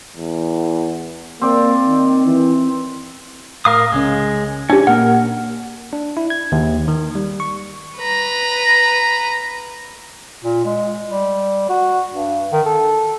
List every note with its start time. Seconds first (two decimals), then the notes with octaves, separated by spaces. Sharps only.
0.16 E2
1.42 A#3 C4 D5
1.86 D#3
2.26 E3
3.65 A2 A#4 F5 D#6
3.92 C2 C#3 G#3 C#4
4.70 C#4 D4 G4
4.87 A#2 A#3 A#4 F#5
5.93 D4
6.17 E4
6.30 G#6
6.52 D#2
6.88 D#3
7.15 G3
7.40 C#6
7.98 B4 A#5
10.44 A#2
10.65 G#3
11.09 G3
11.69 F#4
12.14 G2
12.52 D#3
12.66 A4